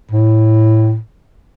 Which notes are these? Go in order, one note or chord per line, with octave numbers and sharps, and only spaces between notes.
A2